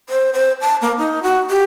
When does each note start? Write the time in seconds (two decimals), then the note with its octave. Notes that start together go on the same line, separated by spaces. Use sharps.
0.09 C5
0.34 C5
0.61 A5
0.82 A#3
0.98 D#4
1.23 F#4
1.50 G4